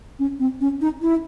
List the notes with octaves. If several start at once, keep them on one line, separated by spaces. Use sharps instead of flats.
C#4
C4
C#4
D#4
E4